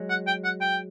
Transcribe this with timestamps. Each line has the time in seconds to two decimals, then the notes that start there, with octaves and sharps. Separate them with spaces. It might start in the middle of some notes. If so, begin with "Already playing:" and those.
Already playing: F#3 G#3
0.09 F#5
0.27 G5
0.44 F#5
0.61 G5